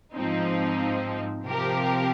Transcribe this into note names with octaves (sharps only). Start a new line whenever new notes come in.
G#2 F3 C4 D#4
C3 F3 C4 G4 A#4